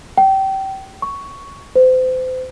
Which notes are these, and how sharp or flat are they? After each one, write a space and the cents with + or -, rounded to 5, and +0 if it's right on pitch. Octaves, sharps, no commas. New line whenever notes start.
G5 -25
C#6 +5
C5 -35